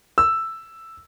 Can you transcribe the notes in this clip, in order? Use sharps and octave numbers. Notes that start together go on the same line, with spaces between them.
E6